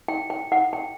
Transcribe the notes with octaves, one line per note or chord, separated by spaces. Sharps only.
G5
G5
F#5
G5